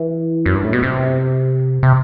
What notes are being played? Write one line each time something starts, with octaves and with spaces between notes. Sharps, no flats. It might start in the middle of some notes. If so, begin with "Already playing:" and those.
Already playing: E3
F#2
G2
A2
B2
C3
C3